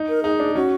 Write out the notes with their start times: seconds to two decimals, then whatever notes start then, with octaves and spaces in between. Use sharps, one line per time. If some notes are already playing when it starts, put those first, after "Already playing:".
Already playing: D#4
0.09 A#4
0.23 D#4 G#4
0.40 D4
0.55 C#4 F#4